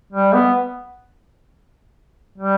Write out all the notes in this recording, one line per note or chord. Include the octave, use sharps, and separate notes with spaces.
G3
B3
G3